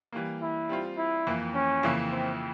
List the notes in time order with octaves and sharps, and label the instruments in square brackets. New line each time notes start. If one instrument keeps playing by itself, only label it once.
[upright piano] E3 G3 A#3
[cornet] E4
[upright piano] G3 C4 F4
[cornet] E4
[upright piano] F2 E3 A#3
[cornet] C#4
[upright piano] F2 C#3 E3 A#3 E4
[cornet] C4